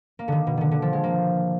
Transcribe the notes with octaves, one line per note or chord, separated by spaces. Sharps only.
A#3
D3 D#3
B2
D3 D#3
D3
F3
G#3
A#3